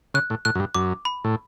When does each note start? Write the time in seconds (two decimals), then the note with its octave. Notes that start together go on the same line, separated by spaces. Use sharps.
0.14 C#3 F#6
0.30 A2
0.45 A2 F#6
0.55 F#2
0.60 G2
0.75 F#2 D6
1.05 B5
1.24 A2